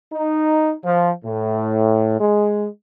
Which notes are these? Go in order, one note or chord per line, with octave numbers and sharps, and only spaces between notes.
D#4
F3
A2
G#3